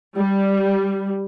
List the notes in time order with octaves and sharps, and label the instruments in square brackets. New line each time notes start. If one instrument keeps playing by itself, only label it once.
[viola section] G3